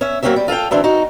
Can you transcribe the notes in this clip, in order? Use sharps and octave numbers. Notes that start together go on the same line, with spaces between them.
C#4 E5
F#3 A#3 C4 C#4 F#4 E5
G3
F4 A4 F5 G5
D2 E3 C4 D4
D#4 F#4